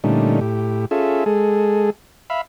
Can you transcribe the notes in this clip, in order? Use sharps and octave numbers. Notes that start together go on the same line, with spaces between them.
A#2 D3 G3 A3 C#4 D#4
A2 G4
C#4 F4 G#4 A4 E5
G#3 G#4 A4
E5 F5 B5